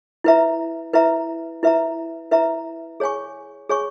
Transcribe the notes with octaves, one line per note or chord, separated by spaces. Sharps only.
E4 B4 E5 A#5
E4 B4 E5 A#5
E4 B4 E5 A#5
E4 B4 E5 A#5
G#4 C#5 G#5 C#6
G#4 C#5 G#5 C#6